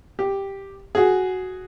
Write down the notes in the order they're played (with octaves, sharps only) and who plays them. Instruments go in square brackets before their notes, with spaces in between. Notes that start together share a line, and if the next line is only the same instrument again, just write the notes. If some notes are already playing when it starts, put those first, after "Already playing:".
[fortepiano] G4
F#4 G#4